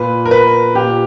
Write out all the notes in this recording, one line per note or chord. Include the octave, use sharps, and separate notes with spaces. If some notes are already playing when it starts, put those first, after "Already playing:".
Already playing: A#2 B4
A#4
B4
A#2 G4